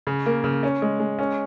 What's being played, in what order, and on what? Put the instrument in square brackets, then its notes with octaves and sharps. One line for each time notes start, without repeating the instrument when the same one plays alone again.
[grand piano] C#3
A#3
C#3
C#4
G#3
G#3
C#4